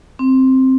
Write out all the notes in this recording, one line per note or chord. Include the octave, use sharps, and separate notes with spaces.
C4